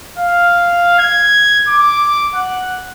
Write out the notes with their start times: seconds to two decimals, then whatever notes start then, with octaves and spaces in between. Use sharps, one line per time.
0.18 F5
0.99 G#6
1.68 D6
2.35 F#5